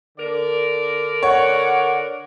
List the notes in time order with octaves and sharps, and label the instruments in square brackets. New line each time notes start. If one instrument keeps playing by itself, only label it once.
[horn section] D3 A#4 D5
[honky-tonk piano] C#5 [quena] F#5